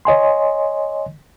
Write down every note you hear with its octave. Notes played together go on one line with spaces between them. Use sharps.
C#5 D#5 G#5 C6